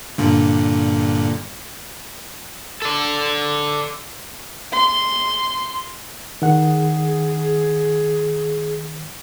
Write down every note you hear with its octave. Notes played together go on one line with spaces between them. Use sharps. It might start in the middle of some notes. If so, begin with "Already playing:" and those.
G2 A#2 D3
A4 D5
C6
D#3 G#4 F#5